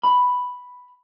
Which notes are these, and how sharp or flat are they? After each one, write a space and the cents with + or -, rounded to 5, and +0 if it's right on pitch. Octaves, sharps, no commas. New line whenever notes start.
B5 +0